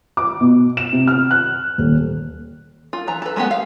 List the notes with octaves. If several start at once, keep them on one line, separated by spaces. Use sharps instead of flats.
D6
B2
E7
C3
F6
F#6
D#1
F4
E3 A#5
A4 B4
G#3 A3 B3 G4 F#5
F5